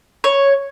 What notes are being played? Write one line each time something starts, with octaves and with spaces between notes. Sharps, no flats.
C#5